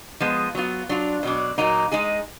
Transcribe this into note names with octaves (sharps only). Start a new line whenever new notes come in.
F3 G#3 B3 F4
F#3 B3 F4
F#3 D4 F4
B2 F#3 D4
A#2 F#3 A#3 D#4
G#3 D#4 G#4